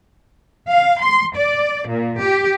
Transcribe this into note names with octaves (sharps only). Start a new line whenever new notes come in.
F5
C6
D5
A#2
G4